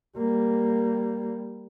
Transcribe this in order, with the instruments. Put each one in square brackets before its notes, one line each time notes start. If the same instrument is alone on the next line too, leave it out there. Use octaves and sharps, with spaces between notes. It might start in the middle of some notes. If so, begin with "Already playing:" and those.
[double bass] G3 A#3